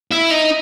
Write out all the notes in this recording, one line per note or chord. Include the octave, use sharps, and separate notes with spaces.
E4
D#4